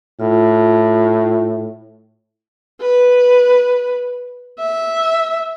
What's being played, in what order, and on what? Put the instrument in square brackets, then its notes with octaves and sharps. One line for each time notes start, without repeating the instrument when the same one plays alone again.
[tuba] A2 [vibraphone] F4
[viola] B4
E5